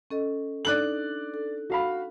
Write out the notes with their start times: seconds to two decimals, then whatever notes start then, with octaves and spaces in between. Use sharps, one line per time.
0.11 C#4 A4 D#5
0.65 D4 D#4 A4 D5 F#6 F#7
1.34 A4
1.70 F#4 F5 B5